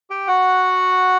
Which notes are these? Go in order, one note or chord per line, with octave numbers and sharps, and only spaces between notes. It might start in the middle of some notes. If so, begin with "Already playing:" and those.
G4 G5
F#4 F#5